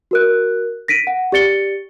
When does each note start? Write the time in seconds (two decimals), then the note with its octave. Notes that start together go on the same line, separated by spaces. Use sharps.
0.11 F#4 A#4 F#6
0.88 A#6 B6 D7 D#7
1.07 F#5
1.32 G4 D5 A6 C#7 G7